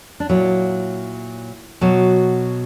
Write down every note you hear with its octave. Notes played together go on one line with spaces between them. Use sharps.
D4
A#2 F#3 E4
B2 F#3